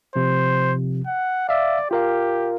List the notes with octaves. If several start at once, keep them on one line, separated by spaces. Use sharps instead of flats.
C3 F3 C5
F#5
D5 E5 F5
F4 G4 A#4 F5